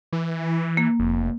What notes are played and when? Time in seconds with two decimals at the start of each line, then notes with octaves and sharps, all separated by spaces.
0.13 E3
0.77 A#3
0.99 F1